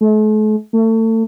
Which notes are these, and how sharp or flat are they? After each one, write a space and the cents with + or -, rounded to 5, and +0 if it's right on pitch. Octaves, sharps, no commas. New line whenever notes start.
A3 -45
A3 +30